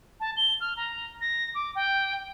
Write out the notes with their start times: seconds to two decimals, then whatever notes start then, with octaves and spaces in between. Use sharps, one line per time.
0.20 A5
0.37 G7
0.61 F6
0.77 A#5
1.21 A#6
1.55 D6
1.75 G5